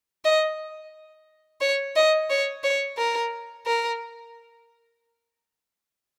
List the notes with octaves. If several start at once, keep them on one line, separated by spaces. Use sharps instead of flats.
D#5
C#5
D#5
C#5
C#5
A#4
A#4